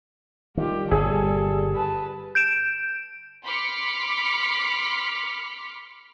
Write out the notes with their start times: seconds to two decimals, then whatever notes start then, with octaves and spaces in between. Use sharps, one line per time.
0.57 D#3 G3 F4 G4
0.91 G1 A#2 G#4 A4
1.75 B4 A5
2.35 G6 D7 E7
3.45 B5 C6 D6 F6 B6 C#7